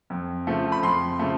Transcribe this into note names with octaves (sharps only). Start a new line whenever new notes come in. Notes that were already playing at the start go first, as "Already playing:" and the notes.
F2
C#3 F3 A3
B5
F2 C6
C#3 F3 A3